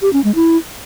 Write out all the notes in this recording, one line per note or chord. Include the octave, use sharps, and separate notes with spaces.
G4
C#4
G#3
E4